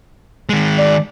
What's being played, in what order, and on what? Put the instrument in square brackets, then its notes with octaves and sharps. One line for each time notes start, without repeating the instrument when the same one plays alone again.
[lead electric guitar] D#3 G#3
[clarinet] D5